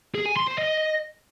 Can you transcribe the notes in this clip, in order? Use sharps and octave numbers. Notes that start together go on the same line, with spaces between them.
G#4
G#5
C6
C5
D#5